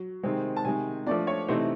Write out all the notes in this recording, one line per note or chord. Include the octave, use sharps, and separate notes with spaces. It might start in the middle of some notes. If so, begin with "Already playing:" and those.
Already playing: F#3
C3 D#3 G#3 C4
A5
C3 D#3 G#3 G#5
F3 A3 D4 D5
C#5
C3 E3 A3 C4 D#4 C5